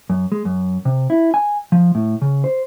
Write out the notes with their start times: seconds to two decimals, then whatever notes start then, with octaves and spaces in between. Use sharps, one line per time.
0.10 F#2
0.32 G#3
0.45 F#2
0.85 C3
1.10 E4
1.34 G#5
1.72 F3
1.95 A2
2.22 C#3
2.44 C5